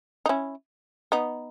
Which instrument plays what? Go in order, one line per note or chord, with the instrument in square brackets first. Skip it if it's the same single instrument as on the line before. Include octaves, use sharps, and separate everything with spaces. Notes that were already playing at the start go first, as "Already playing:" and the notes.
[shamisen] D#4
C#4 E4
B3 D#4